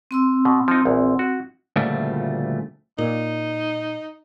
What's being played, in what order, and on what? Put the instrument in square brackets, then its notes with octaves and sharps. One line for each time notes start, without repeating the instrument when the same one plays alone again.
[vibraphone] C4 C6 E6
[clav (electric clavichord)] B2
F3 D#4
A#1 E2
F#4
[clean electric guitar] D2 A#2 C#3 F3 G3 A3
[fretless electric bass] A#2 [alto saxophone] D#4